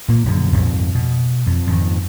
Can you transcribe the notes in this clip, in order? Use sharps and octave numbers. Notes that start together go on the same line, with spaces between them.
A#2 A#3
A#1 F#2 B2 D3
A#1 F2 G#2
B2
F2
F2 G#2 D#3